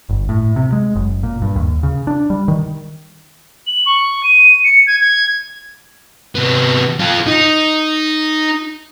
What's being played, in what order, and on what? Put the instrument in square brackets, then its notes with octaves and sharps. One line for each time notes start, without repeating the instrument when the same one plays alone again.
[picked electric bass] G1
A2
C3
G#3
F#1
A#2
G2
D#2
C#3
D4
G3
D#3
[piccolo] F#7
C#6
D#7
C#7
G#6
G#6
[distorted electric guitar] C3 B3
F4 A4
D#4